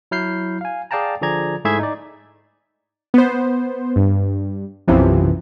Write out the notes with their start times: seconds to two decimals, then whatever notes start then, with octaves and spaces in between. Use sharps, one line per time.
0.11 F#3 E4 F6 G6 C7
0.61 F5 G#5
0.91 G#4 D5 F5 G5 A5 A#5
1.21 D3 F3 G#4 D5 A#5 G#6
1.65 G#2 A3 E4 G#4 E5 G#6
1.79 D#4 D5
3.14 B3 C5
3.96 G2
4.88 B1 F#2 C3 E3 F3